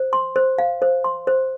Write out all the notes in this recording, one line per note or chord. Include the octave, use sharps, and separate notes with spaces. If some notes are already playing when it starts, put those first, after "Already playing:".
Already playing: C5
C6
C5
F5
C5
C6
C5